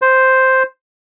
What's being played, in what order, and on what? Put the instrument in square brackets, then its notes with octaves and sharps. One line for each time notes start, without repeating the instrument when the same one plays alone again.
[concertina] C5